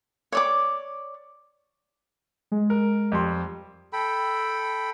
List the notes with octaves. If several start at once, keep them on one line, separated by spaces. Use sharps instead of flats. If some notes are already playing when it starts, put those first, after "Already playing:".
C#5 D5 D6
G#3
A#4
F2 G3 C6
A4 G5 B5